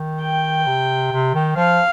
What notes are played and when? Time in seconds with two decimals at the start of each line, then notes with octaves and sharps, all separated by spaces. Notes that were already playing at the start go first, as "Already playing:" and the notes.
Already playing: D#3
0.21 G5
0.67 C3
1.12 C3
1.34 D#3
1.56 F3 F5